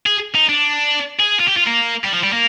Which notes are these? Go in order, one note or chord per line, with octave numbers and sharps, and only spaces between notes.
G#4
D#4
D4
G#4
F4
G4
F4
A#3
G3
F3
G3
A#3